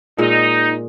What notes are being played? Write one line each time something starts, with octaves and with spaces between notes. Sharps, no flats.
A#2 G#3 D#4 D#5